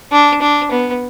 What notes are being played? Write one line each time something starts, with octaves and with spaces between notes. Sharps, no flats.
D4
D4
B3